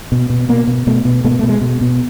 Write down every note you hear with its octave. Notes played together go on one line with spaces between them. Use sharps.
B2
B2
B2 A#3
B2
B2 A3
B2
B2 A3
A#3
A3
B2
G#3
B2
B2